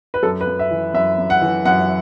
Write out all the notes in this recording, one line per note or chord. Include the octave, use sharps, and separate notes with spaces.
B4
F#2 A4
B4
F#2
E5
E3
F#2 E5
F#2
F#5
E3
F#2 F#5